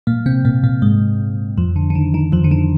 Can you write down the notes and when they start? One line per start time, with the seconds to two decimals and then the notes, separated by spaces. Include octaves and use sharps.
0.07 A#2 A#3
0.26 C3 C4
0.45 A#2 A#3
0.63 A#2 A#3
0.82 G#2 G#3
1.58 F2 F3
1.76 D3
1.90 D3
1.95 D#3
2.14 D#3
2.32 F2 F3
2.44 D3
2.51 D#3